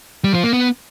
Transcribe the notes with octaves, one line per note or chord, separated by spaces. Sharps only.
G3
F3
A#3
B3